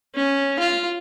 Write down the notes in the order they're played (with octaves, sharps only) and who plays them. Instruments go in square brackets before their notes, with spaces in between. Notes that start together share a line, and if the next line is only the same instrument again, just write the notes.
[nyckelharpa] C#4
F4